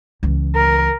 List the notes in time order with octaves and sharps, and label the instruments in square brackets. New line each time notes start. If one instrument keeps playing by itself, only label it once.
[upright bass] C#2 E3
[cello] A#4